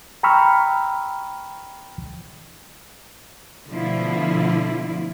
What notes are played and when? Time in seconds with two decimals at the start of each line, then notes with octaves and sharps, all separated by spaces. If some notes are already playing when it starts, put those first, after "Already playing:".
0.23 G5 A#5 B5 C#6 E6 F6
3.69 B2 D3 F3 A3 E4 F4